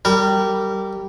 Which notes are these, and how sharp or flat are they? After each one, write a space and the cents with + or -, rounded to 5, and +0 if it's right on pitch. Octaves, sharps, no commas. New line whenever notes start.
G3 -15 A#4 -30